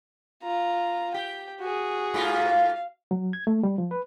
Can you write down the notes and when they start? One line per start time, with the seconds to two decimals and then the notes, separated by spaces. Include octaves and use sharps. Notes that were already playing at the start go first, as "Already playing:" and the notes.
0.43 F4 A#5
1.14 G4 G5
1.60 F#4 G#4
2.14 G#2 A#3 F4
2.48 F5
3.11 F#3
3.33 G#6
3.47 A3
3.63 G3
3.78 F3
3.91 B4